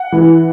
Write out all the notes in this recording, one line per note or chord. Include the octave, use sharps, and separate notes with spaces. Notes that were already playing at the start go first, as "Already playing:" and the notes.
Already playing: F#5
E3